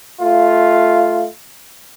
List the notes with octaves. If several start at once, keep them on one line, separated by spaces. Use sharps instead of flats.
A3 F4